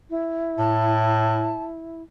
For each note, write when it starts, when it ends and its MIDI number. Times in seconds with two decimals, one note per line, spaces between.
0.10 2.03 64
0.58 1.54 45
0.58 1.63 81